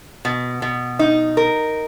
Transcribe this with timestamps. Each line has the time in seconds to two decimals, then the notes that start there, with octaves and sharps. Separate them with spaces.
0.25 B2
0.62 B2
0.99 D#4
1.37 A#4